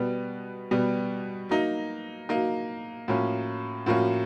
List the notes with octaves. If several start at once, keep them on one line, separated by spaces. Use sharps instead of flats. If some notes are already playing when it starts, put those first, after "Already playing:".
Already playing: B2 G3 B3
B2 G3 B3
F#3 A#3 D#4
F#3 A#3 D#4
A2 F3 A#3 C#4 F#4
A2 F3 A#3 C#4 F#4